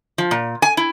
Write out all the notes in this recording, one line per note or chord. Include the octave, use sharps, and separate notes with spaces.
F3
A#2
G#5
E4